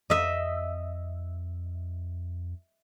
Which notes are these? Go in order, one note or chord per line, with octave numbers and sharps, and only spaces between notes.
F2 D#5 E5